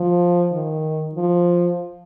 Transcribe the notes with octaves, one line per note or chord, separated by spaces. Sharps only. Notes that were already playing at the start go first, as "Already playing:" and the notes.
Already playing: F3
D#3
F3